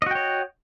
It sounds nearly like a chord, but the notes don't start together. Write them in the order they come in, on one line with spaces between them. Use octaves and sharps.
D#5 F#4 G5 C#5